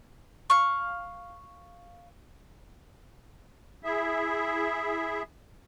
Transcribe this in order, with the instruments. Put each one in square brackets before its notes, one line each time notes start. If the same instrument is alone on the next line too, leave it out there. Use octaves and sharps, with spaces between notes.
[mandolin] F5 C#6
[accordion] E4 G#4 E5